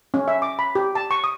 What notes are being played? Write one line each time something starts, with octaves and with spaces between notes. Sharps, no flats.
C#4
E5
D6
B5
G4
A5
C#6
D#6